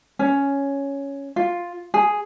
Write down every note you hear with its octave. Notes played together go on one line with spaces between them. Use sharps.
C#4
F4
G#4